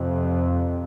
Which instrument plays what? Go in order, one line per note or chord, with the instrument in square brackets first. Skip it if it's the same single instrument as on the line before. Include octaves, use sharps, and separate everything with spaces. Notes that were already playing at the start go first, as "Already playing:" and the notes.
Already playing: [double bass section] F2 C3